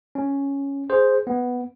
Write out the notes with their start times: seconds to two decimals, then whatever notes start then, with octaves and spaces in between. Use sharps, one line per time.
0.15 C#4
0.90 G#4 C5
1.27 B3